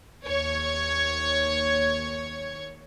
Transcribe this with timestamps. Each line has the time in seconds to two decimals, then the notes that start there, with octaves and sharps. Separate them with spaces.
0.25 D#2 C#5 G#6